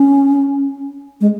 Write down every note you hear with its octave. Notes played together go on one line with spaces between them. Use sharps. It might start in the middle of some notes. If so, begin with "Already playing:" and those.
Already playing: C#4
G#3